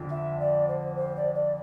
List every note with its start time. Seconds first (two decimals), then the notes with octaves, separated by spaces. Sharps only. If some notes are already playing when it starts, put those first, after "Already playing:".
Already playing: F2 D3 F3
0.11 E5
0.40 D5
0.68 C5
0.97 C5
1.16 D5
1.35 D5